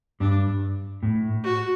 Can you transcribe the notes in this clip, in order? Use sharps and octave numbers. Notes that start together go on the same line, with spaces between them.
G2 D4
A2
F#4